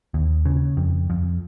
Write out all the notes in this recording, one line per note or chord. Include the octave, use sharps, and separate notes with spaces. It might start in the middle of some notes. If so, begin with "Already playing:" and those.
D#2
C#3
F2
F2